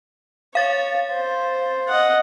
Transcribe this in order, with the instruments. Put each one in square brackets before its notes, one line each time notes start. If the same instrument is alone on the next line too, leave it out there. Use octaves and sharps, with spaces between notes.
[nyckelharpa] C#5 [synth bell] F5 A6
[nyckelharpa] C5
D#5 F#5